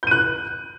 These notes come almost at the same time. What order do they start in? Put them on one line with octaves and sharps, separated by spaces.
G6 D#7 F#6